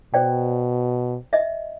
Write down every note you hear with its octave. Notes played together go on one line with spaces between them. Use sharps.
B2 C5 D5 G5
D#5 E5